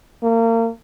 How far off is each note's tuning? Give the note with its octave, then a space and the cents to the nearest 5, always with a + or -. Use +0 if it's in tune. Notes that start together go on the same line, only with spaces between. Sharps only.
A#3 -30